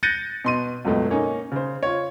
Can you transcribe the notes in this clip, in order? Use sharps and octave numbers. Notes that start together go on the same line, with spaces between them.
F#6 G6 A6 A#6 C#7 D#7
B2 C6 D#7
C#2 F#2 B2 A3
A#3 C#4 D#4
C#3 C5
F4 C#5